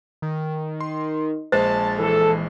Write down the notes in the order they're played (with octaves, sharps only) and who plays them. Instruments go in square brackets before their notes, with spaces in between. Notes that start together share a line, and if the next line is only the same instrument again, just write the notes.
[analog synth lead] D#3
[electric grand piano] C6
[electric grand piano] A#1 G#3 A6 [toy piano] C5 [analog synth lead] A5
[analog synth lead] E3 [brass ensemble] A4